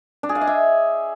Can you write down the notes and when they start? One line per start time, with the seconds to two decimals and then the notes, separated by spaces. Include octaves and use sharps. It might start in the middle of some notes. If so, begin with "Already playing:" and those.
0.23 D4
0.29 G#4
0.35 F5
0.41 D#5
0.47 E5